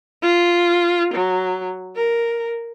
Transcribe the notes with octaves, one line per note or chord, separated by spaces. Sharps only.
F4
F#3
A#4